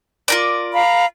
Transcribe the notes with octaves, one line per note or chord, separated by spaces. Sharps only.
F4 A#4 D5
F5 A#5 B5